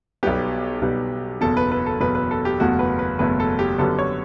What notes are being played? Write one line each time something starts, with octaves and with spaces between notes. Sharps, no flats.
B1 B2 G3 B3 G4
B1 B2 G3 B3
F#1 E2 B2 A4
B4
B4
A4
F#1 E2 B2 B4
B4
A4
G4
F#1 E2 B2 A3 F#4
B4
B4
F#1 E2 B2 A3 B4
A4
G4
F#2 D3 G3 B3 A4
C#5